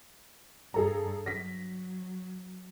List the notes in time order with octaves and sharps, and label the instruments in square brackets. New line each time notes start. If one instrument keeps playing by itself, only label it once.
[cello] G2 [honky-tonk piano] G#4 A4 A#5
[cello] F#3 [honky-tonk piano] A#6 B6